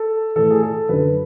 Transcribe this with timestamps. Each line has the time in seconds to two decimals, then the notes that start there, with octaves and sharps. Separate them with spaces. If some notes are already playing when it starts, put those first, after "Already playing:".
Already playing: A4
0.36 A2 E3 A4
0.51 G#4
0.63 A4
0.89 F#2 D3 B4